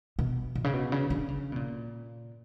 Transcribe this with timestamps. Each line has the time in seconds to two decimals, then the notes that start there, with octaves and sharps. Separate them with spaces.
0.19 B2
0.55 A#2
0.64 C#3
0.73 B2
0.92 C#3
1.10 D3
1.28 C#3
1.52 B2
1.56 A#2